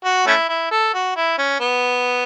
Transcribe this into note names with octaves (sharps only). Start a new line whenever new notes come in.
F#4
A3 C#4 E4
E4
A4
F#4
E4
C#4
B3